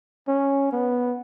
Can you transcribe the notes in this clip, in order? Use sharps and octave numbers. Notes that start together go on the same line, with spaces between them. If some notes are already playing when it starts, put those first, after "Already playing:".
C#4
B3